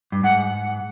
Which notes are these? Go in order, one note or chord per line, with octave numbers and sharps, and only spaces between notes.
G2
G#2 F#5